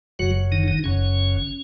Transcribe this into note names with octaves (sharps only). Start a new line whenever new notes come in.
F#1 F#2 C#3 F#3 F#4
D#3 D#4
D#3 D#4
F#1 F#2 C#3 C#4